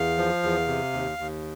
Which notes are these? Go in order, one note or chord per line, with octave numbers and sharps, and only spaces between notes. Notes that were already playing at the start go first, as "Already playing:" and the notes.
Already playing: E2 F5
F3
E2
C3
D#2
D#2